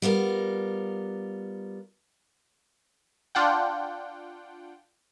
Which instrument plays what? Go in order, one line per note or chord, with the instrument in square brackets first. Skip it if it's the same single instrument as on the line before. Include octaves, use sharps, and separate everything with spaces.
[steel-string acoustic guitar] G3 B3 F4 A#4
[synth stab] D4 F4 F#5 G5